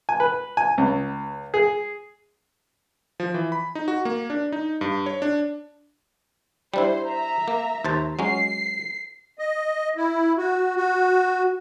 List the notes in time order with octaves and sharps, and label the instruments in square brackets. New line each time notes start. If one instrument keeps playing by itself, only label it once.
[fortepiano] G#5
B4
G#5
C#2
G#4
[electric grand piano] F3
E3
B5
D#4
F#4
A#3
D4
D#4
G2
C#5
D4
[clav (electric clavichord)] G3 D4 E4 [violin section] C5
[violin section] E5 A#5
[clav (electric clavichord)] A#3
D#2 C5 A5
[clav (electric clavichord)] F#3 G#3 C#4 [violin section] C7
[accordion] D#5
E4
F#4
F#4